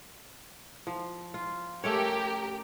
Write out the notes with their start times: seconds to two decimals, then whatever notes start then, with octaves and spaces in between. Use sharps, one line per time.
0.87 F3
1.34 F4
1.84 A3 C#4 G4 A#4 C#5